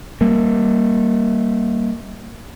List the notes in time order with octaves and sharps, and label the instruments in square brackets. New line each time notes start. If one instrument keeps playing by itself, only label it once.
[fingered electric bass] G3 A#3